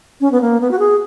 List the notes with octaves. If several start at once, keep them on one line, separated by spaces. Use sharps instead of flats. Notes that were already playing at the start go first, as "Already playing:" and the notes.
C#4
B3
A#3
B3
F#4
G#4